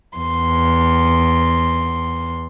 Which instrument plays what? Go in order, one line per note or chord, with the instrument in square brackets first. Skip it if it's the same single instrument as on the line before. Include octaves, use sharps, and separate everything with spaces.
[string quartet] E2 C6